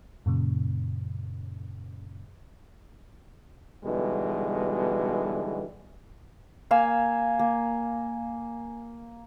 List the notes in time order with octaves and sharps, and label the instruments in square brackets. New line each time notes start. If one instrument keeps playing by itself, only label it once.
[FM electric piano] F#2 A#2 C#3
[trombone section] B1 B2 D3 E3 G3 G#3
[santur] A#3 F5 G#5 E6
A#3